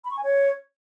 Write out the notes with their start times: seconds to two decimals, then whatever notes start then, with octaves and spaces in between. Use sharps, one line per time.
0.04 B5
0.11 C#6
0.17 G#5
0.23 C#5